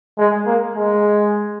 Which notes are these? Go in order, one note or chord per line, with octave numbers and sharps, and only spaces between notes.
G#3
A#3
G#3